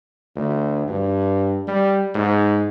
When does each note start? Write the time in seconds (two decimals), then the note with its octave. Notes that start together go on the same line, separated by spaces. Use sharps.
0.36 D2
0.88 G2
1.68 G3
2.15 G#2